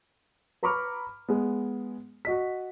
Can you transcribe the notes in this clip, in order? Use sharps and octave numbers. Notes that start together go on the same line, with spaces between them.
B4 A#5 B5 C#6 D6 F6
G#3 B3
F#4 D#5 B6